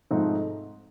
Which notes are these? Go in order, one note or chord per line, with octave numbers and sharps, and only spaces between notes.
G#2 F3 A3 C4 D#4